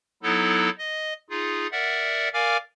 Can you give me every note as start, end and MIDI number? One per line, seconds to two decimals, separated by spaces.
0.23 0.69 54
0.23 0.69 59
0.23 0.69 63
0.23 0.69 64
0.23 0.69 69
0.78 1.13 75
1.30 1.67 63
1.30 1.67 65
1.30 1.67 68
1.72 2.29 70
1.72 2.29 74
1.72 2.29 76
1.72 2.29 78
2.33 2.57 70
2.33 2.57 74
2.33 2.57 77
2.33 2.57 80
2.33 2.57 86
2.33 2.57 89